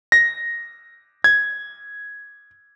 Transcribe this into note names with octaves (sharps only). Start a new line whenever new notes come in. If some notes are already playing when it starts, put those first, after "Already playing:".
A#6
G#6